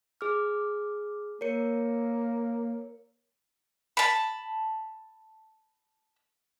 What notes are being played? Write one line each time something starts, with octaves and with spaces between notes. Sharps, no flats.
G#4 D6 F6
A#3 A#4 C#5 C#7
A5 B5